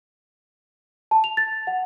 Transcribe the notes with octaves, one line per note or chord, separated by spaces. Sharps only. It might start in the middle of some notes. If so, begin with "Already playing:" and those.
A5
F7
A6
F#5